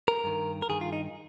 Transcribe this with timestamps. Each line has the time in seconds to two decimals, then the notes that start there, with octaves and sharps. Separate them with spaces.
0.08 A#4
0.24 G2 D#3
0.62 A#4
0.69 G2 D#3 G#4
0.81 F4
0.93 D#4